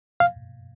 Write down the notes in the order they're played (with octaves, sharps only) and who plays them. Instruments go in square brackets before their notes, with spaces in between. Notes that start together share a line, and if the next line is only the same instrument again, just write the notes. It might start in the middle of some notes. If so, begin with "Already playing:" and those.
[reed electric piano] F5